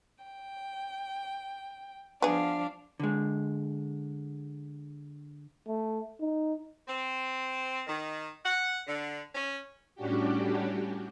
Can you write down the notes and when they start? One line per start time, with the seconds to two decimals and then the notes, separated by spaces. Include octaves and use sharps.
0.24 G5
2.22 F3 B3 D4 G#4 F5
3.00 D3 G#3
5.68 A3
6.20 D#4
6.88 C4
7.87 D#3
8.45 F#5
8.87 D3
9.34 C#4
9.95 A2 G3 C#4 D4 F#4 G4